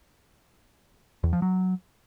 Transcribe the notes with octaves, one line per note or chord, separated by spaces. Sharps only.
E2
F3
F#3